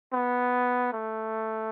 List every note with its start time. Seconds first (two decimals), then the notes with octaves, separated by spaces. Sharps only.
0.13 B3
0.93 A3